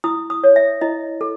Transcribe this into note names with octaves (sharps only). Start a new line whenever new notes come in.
E4 D#6
D#6
C#5
E5
E4 D#5
A4